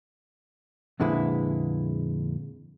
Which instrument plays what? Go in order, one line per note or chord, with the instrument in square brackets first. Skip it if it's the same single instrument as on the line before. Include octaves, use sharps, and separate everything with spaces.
[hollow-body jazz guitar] F2 A#2 D3 G#3 E4 B4